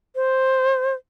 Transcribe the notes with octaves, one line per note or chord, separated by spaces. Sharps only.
C5